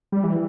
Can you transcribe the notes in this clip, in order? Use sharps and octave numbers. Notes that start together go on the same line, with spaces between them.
G3
E3